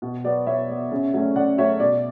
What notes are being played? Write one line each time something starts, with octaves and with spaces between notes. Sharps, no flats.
B2
F#3 B3 D5
B2 C#5 E5
F#3 B3
C#3
F#3 A3 C#4
C#3 D5 F#5
F#3 A3 C#4 C#5 E5
B2 D5